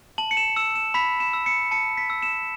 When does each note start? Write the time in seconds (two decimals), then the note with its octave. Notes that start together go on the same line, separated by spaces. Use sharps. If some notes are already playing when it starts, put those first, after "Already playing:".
0.18 A5 F#7
0.31 C#7
0.37 E7
0.56 E6 E7
0.75 E7
0.94 B5 B6
1.20 E7
1.33 E6
1.46 C#7
1.71 A5 C#7
1.97 B6
2.10 E6
2.22 E7